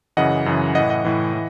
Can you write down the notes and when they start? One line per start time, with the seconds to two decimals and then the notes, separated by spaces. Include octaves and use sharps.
0.17 F#2 C#3 E3 D#5 F#5
0.46 F#2 C#3 E3
0.75 A2 E3 D#5 F#5
0.90 D#5 F#5
1.05 A2 E3
1.34 E3